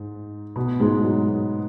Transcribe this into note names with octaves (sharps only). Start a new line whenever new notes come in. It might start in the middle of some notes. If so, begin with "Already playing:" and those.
Already playing: G#2
B2 B3
G#2 G#3
F#3
F#3